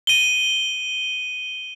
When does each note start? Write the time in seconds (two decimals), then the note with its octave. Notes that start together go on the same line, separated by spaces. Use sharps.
0.07 D#7 G7